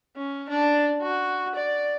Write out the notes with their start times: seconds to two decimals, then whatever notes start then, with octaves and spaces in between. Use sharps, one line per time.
0.17 C#4
0.50 D4
1.02 F#4
1.56 D5